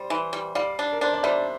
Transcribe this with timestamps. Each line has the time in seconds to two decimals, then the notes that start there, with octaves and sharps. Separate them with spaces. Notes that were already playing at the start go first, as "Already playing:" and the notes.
Already playing: G3 C5
0.10 E3
0.33 G3
0.55 G3 D5 F5
0.79 D4
0.92 A#4
1.01 D4 C5
1.14 D5
1.23 G3 C5 E5